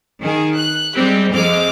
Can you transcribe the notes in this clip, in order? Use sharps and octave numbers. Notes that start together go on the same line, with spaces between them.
D#3 G#4
F#6
G3 G#3 C4 G4
F2 G#3 C4 D6 F6